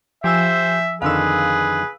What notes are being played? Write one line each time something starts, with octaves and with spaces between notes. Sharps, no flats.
F3 G4 C5 E5 G#5 E6
F2 D3 D#3 G#4 B4 F5 E6